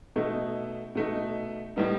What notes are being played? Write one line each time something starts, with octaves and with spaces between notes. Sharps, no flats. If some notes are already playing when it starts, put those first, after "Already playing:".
B2 A3 D#4
B2 A3 D#4
A2 G3 B3 D#4